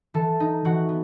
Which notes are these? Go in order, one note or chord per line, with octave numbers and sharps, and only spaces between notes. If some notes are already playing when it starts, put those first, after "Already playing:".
E3 A4 A5
D#4
E3 F#4 F#5
B3